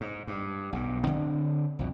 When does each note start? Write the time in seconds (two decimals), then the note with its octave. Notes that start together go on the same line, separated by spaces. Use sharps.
0.01 G#2
0.27 G2
0.73 B1 G2
1.03 D3 C4
1.79 C2 F2 B2